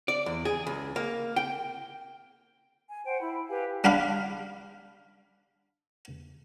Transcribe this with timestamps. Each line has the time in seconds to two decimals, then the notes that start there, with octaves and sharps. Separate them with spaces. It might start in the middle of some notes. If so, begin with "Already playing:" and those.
0.08 D5
0.26 E2
0.45 G#4
0.67 C#2
0.96 A#3
1.36 G5
2.90 G#5
3.05 C5 F#5 G5
3.21 E4 B5
3.49 G4 B4 F5 G#5
3.84 G3 D4 G4 F5 B5